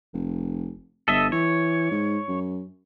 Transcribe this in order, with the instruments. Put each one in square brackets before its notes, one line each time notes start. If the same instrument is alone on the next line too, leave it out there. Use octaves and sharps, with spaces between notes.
[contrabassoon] F1
[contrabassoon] G1 [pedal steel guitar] A4 D#5 E5
[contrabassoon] E3 [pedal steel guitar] C#5
[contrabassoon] G#2
F#2